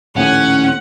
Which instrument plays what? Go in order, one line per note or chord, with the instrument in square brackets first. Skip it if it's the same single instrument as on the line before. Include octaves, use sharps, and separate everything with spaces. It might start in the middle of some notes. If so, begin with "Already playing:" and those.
[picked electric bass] A#1 D#2 A2 [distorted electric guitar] C#4 [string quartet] F#5